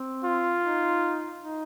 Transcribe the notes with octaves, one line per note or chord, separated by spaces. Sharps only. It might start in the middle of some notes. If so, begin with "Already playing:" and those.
Already playing: C4
F4
D#4
D#4